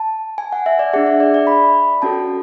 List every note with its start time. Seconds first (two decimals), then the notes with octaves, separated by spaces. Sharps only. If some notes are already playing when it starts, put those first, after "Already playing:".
Already playing: A5
0.38 G#5
0.52 F#5
0.66 E5
0.79 D5
0.93 D4 G#4 F#5
1.06 E5
1.20 D5
1.34 D5
1.47 B5
2.02 C#4 F#4 A4 A5